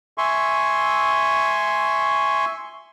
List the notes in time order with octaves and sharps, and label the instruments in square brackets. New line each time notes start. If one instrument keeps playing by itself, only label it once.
[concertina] E5 G#5 C6 C#6